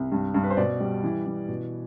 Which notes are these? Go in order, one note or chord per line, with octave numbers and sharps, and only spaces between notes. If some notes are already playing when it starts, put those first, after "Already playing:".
Already playing: C2
G2
G2
B4
C5
B2 D5
G3
E3
E3
B2